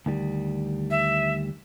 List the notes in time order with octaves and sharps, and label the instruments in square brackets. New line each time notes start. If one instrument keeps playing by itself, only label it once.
[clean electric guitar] D2 D#3 G3
[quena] E5